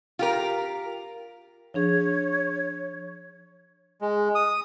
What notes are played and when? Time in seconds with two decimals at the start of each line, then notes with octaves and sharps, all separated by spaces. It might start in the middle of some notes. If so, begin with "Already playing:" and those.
0.19 F4 G4 A#4
1.74 F3 D4 G#4 C#5
4.01 G#3
4.35 D#6